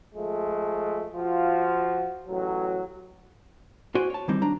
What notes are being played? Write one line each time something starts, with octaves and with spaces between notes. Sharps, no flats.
F3 G#3 A3
F3 F4 F#4
A1 F#3
F4 F#4 C5 D5 G#5 C6
C#5 A5
D#3 E3 G3 C4 D#4
F#3 D4 A#5